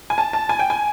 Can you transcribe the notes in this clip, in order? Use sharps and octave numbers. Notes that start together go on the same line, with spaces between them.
G#5
A5
A5
G#5
G5
G#5